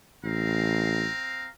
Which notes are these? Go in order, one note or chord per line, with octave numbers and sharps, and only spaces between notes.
A1 C4 F5 A#5